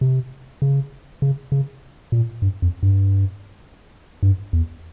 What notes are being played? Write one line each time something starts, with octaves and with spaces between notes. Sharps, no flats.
C3
C#3
C#3
C#3
A#2
G2
F2
G2
G2
E2